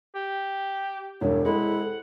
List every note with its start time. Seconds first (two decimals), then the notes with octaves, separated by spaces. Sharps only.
0.15 G4
1.21 E1 G2 C#5
1.45 C3 G#3 E4 A4 F#5